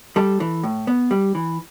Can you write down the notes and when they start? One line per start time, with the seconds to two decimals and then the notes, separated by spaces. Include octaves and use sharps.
0.16 G3 A4
0.40 E3
0.63 A2
0.87 B3
1.11 G3
1.35 E3